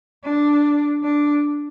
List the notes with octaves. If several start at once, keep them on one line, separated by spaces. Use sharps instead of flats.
D4
D4